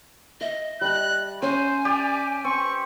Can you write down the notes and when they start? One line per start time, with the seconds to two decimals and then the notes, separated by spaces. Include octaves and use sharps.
0.41 D#5 E5
0.81 G3 A5 F#6
1.42 C#4 C5 C#5 G#5
1.85 G4 D5
2.44 C4 C#6